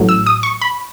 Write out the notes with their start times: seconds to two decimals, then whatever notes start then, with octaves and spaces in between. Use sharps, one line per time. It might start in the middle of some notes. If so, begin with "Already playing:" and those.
Already playing: A1 A2 F#3
0.09 E6
0.26 D#6
0.43 C#6
0.61 B5